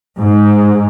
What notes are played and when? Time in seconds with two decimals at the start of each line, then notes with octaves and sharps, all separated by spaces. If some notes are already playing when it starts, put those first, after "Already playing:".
0.19 G#2